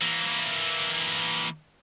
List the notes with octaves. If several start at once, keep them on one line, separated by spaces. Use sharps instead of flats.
E3 A#3